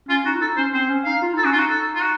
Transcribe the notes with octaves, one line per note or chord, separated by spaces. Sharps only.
C#4 F4
D#4 F#4
F4
D#4 A4
C#4 C5
C4 C5
C#4
D#4 F5
F4
D#4 A4
C#4 F#4
F4
D#4 F#4
A4
F4
F#4